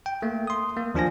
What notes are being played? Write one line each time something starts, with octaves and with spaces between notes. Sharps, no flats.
G5
A3 A#3
C6 D#6
A#3
D#2 F3 D4 F4 G#5 A#6